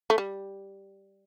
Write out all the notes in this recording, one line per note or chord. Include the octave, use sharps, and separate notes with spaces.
A3
G3